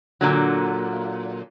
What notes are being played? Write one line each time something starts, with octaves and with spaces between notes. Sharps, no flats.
A#2 D3 F#3